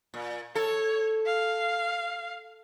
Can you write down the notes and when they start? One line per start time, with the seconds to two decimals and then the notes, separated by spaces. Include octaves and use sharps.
0.14 A#2
0.55 A4 C#5
1.26 F5